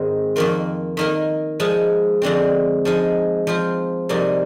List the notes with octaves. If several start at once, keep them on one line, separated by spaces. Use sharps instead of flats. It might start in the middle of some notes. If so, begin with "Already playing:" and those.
Already playing: G#2 D#3 G#3 C4 D#4
F2 D#3 A#3 F4
D#3 A#3 D#4 A#4
F3 G#3 D#4
F2 D3 G#3 C4
F3 G#3 D#4
F3 C4 F4 C5
F2 C3 G3 A#3 D#4